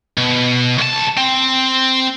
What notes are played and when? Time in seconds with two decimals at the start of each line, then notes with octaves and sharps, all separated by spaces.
0.18 B2
0.78 C2 A5
1.17 C4